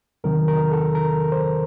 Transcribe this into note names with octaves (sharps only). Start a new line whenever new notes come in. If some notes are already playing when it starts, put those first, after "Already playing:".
E2 C3 D#3 F#3 A#4
A#4
A4
A#4
C5